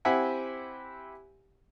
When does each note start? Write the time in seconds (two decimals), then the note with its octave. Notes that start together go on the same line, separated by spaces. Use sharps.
0.05 C4 E4 G4 E5 F#5 G#5